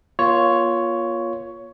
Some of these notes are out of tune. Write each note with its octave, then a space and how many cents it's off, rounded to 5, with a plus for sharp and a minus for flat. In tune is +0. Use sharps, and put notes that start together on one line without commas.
A#3 +45 F4 +0 C#5 +10